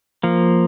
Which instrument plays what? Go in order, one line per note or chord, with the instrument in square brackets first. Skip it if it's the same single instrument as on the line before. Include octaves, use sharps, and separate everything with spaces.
[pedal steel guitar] F3 A#3